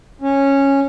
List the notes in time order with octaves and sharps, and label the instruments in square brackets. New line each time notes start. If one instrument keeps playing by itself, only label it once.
[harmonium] C#4